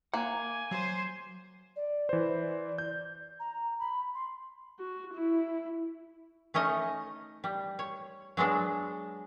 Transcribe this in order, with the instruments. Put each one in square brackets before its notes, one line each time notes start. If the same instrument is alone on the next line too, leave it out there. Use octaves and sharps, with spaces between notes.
[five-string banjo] A#3 [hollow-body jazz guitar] F#5 [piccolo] G#5
[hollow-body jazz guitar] F#3 [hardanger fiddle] C5 C6
[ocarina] D5
[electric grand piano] E3 C5
G6
[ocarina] A#5
B5
C6
[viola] F#4
E4
[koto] A3 C#4 D#4 D#5
G3
C#5
F#3 G#3 B3 D4